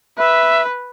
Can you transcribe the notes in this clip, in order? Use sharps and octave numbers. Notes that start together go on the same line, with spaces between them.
B4 E5